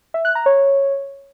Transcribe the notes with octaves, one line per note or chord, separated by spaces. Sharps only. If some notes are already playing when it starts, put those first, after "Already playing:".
E5
F#6
A#5
C#5